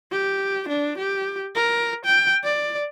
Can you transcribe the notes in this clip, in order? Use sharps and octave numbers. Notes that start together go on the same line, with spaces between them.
G4
D4
G4
A#4
G5
D5